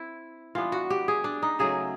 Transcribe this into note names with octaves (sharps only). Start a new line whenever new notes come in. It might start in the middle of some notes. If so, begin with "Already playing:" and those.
Already playing: C4 E4
E3 G3 B3 D4 F4
F#4
G4
G#4
D4
D#4
C#3 F#3 A3 G#4